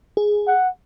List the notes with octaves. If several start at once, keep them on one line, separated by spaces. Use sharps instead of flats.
G#4
F#5